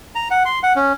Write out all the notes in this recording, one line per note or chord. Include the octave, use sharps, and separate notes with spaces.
A#5
F#5
C6
F#5
C#4